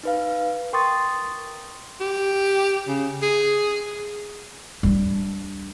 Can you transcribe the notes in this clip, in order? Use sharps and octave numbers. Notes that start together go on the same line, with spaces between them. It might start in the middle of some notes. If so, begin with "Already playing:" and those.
D#4 B4 F5
A#4 G5 C6 C#6 D#6 A6
G4
C#3
G#4
G3 D4